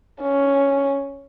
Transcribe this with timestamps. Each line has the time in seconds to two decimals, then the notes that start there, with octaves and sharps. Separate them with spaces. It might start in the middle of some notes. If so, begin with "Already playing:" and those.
0.22 C#4